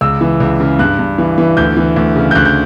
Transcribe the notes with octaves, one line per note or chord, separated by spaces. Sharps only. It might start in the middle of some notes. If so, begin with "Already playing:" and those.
C#2 E6
E3
C#2
C#3
G2 F#6
G2
E3
E3
D2 G6
E3
D2
C#3
G6
D2 F#6
G6